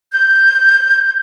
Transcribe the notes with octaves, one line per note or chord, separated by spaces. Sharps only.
G6